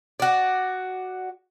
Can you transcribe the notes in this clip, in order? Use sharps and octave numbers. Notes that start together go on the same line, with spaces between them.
F#4 D5